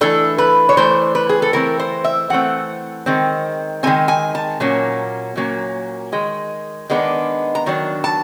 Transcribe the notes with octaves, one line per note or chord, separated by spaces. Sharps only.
E3 A3 D4 A4
B4
C#5
E3 A3 D4 C5
B4
G#4
A4
E3 A3 C4 A#4
C5
E5
E3 A3 C4 F#5
D#3 G#3 C4
D#3 G#3 C4 G#5
G#5
A5
A#2 F#3 A#3 C#4
A#2 F#3 A#3 C#4
D#3 G#3
D#3 G#3 B3 D4
A#5
D#3 F#3 D4
A5